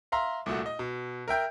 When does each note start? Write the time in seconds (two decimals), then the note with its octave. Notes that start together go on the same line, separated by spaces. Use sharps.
0.12 E5 F5 A#5 C6
0.46 C2 A#2 A3 F#4
0.66 D#5
0.79 B2
1.28 A#4 E5 G5 G6